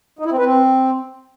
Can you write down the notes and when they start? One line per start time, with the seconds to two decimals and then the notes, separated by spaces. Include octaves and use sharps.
0.19 D#4
0.26 E4
0.32 C4
0.39 B4
0.45 C4